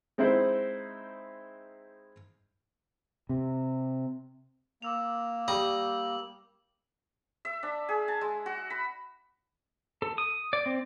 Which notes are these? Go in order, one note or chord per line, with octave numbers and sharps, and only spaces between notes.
G#3 C4 D#4 E4 C5
C3
A#3 D6 E6 F7
G3 A#5 D#6 F#7
E5
D4
G#4
A5
G#3
F#4
B5
A4
D#6
D5
C4